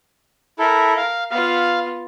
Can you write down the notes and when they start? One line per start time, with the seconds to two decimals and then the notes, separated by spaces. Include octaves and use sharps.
0.59 E4 A4 A#4
0.97 F5
1.31 B3 F4 F5